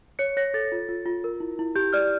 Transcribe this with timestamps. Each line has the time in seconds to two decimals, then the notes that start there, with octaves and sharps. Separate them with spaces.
0.19 C#5 C#7
0.37 C#5 A#6
0.54 A4 A6
0.72 F4
0.89 F4
1.06 F4
1.24 A#4
1.40 E4
1.59 E4
1.76 G4 G6
1.93 D5 F6